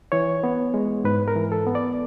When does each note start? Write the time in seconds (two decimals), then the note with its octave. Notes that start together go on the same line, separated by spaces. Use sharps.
0.12 E3 C#5
0.44 B3
0.74 G#3
1.04 G#2 B4
1.28 A#4
1.36 E3
1.52 A4
1.67 B3
1.75 D5